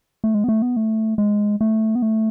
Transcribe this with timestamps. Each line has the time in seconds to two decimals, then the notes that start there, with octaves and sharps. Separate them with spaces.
0.24 A3
0.34 G#3
0.44 B3
0.49 A3
0.62 B3
0.76 A3
1.18 G#3
1.61 A3
1.95 B3
2.02 A3